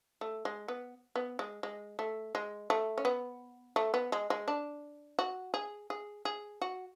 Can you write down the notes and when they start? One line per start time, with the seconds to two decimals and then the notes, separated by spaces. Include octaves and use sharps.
0.21 A3
0.45 G#3
0.68 B3
1.16 B3
1.39 G#3
1.63 G#3
1.99 A3
2.35 G#3
2.70 A3
2.98 C#4
3.05 B3
3.76 A3
3.94 B3
4.12 G#3
4.30 G#3
4.48 D4
5.19 F#4
5.54 G#4
5.90 G#4
6.25 G#4
6.62 F#4